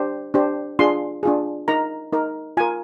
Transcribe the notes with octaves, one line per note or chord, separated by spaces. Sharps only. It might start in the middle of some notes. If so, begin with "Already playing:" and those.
Already playing: D4 G4 C5
D4 G4 C5
D4 F4 G#4 C6
D4 F4 G#4
D#4 A#4 A#5
D#4 A#4
F4 A#4 G#5